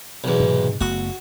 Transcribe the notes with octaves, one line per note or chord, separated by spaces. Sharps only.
B1 E2
G#2 C3
F#1 A3 B3 F#4